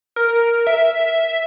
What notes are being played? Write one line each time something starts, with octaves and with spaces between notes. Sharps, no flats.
A#4
E5